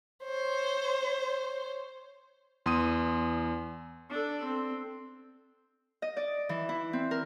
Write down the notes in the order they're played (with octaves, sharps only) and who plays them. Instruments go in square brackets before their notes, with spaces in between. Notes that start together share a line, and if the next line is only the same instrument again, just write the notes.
[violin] C5 C#5
[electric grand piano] E2 C6 D#6 D#7
[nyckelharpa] D4 A4
C4
[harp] D#5
D5
E3
E4
C4
A#4